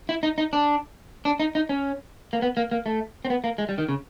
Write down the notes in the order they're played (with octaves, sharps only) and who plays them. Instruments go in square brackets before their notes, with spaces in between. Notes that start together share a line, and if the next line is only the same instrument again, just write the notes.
[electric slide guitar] E4
D#4
D#4
D4
D4
D#4
D#4
C#4
A#3
B3
A#3
A#3
A3
C4
B3
A#3
G#3
G3
D#3
C#3